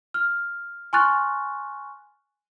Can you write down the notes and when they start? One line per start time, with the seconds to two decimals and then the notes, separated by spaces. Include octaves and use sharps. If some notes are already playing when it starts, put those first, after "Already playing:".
0.14 F6
0.93 G#5 C6 C#6 F6 F#6 A6